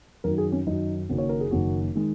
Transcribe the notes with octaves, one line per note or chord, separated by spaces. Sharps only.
F#2 D#3 F#3 A#4
G#4
C#4
F#2 D#3 F#3 D#4
F#1 F#2 D#3 F#3 A#3
C#5
A#4
G#4
F#1 F#2 D#3 F#3 A#3 F#4
D#3 G#3